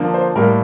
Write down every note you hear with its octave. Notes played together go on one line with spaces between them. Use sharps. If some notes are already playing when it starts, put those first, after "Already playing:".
Already playing: D3 F3 A#3
C5
A2 G3 A#3 A#4